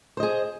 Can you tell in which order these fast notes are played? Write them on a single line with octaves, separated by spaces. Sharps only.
C5 D#5 G#4